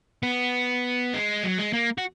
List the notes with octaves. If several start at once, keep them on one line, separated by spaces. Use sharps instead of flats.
B3
G#3
F#3
G#3
A#3
F#4